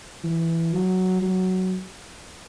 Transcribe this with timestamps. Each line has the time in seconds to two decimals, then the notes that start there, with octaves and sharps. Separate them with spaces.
0.24 E3
0.73 F#3
1.22 F#3